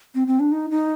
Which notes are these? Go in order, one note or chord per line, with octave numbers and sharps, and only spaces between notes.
C4
C4
D4
D#4
D#4